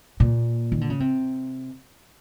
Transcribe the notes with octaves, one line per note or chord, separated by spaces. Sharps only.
A#2
D#3
D3
C#3
C3